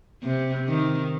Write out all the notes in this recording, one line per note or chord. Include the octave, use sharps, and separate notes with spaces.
C3
D#3